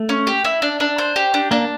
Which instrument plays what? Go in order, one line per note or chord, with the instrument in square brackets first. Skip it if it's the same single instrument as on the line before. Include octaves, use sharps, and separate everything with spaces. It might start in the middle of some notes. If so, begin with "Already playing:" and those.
Already playing: [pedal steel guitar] A3
[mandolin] C#4
G4
E4
D4
D4
C5
G4
D4
[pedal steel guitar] A#3 [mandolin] D4